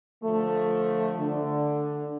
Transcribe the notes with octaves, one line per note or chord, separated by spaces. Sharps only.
D3 F3 A3
D3